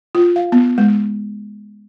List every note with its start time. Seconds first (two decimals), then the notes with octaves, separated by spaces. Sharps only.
0.15 F4
0.36 F5
0.52 B3
0.78 G#3